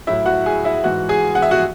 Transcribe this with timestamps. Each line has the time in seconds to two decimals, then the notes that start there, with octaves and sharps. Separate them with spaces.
0.07 A2 F#3 E4 E5
0.26 F#4 F#5
0.46 G#4 G#5
0.64 E4 E5
0.83 G#2 E3 F#4 F#5
1.09 G#4 G#5
1.35 F#5
1.42 E5
1.51 F#4 F#5